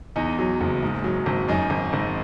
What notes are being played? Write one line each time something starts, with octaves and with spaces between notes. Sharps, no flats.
E2 D#4
F#3
F#1
G#2
F#3
G#1
F#2 D#4
G#1
G#1